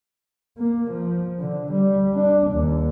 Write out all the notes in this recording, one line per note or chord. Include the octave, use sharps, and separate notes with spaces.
A#3
F3
D3
G3
D4
D#2